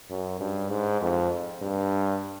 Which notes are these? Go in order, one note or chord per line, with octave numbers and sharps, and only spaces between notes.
F#2
G2
G#2
F2
G2